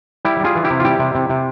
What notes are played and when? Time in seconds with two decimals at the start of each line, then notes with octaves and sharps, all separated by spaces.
0.25 G3 E4 G4
0.40 G3 F4 G#4
0.55 E3
0.65 E4 G4
0.70 C3
0.80 F4
0.85 G3 E4 G4
1.00 C3
1.15 C3
1.30 C3